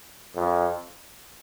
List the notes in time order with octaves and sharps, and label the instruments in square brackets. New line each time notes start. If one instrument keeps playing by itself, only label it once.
[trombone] F2